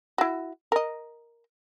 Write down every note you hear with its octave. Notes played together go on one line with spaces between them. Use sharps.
E4 F#4
A#4 D#5